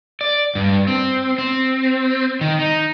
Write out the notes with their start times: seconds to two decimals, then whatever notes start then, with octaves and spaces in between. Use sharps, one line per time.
0.21 D5
0.55 G2
0.87 C4
1.38 C4
2.41 D#3
2.59 D#4